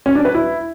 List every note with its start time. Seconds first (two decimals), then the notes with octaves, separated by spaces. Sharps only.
0.06 C#4
0.15 D4
0.25 B4
0.35 E4